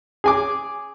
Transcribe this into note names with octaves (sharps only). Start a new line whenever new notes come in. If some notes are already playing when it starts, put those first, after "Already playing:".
G#4 G#5 D6